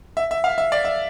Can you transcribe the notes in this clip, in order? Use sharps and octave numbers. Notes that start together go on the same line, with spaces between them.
E5
E5
F5
E5
D5
E5